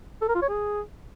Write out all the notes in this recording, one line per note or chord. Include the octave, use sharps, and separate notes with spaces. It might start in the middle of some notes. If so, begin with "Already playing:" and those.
A4
A#4
F4
C#5
G#4